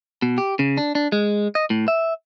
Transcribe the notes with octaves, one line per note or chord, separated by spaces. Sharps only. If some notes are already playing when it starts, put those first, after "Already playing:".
B2
G4
C#3
D4
D4
G#3
D#5
A2
E5